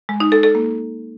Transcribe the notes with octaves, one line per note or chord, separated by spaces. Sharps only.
G#3
D#4
A4
A4
A#3